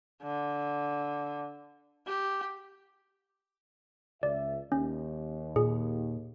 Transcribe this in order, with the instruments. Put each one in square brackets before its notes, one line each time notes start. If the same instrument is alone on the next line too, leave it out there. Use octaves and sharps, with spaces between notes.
[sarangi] D3
G4
[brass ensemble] C#2 E5 [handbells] D5
[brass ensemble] D#2 [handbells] C#4
[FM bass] A#2 [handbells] G#4